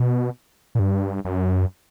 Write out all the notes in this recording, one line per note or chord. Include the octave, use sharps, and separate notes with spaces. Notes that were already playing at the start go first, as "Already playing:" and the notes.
Already playing: B2
A#2
G2
F#2